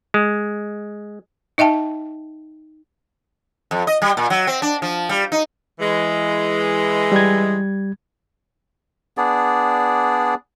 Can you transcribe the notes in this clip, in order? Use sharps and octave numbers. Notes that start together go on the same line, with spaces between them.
G#3
D#4 D#5 E5 G5 A5
F2
D#5
G3
A#2
F#3
C4
D4
F3
G3
D#4
E3 G#3
G3 G#6
B3 D4 G#4 D5